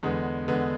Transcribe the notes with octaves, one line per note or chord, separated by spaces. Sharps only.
E2 D3 G#3 B3
E2 D3 G#3 B3